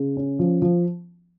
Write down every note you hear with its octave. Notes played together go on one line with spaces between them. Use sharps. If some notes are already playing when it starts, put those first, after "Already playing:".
Already playing: C#3
C#4
F3
F3